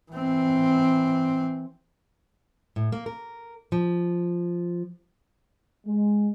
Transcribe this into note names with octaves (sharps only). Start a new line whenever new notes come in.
E3 C4
A2
A#3
A#4
F3
G#3